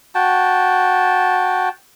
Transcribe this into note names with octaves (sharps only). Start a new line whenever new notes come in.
F#4 G5 A5